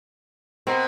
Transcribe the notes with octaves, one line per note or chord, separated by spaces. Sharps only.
B2 C4 A#4